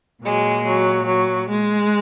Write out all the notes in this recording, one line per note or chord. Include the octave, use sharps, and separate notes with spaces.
A#2 F#3 G#3
F#3
F#3
G#3